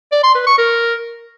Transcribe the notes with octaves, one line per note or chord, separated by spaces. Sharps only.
D5
C6
B4
C#6
A#4